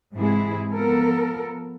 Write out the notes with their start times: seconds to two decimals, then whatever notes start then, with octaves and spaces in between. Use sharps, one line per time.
0.14 G#2 C3 E3 G#3 E4 G#4
0.71 F3 B3 A4 A#4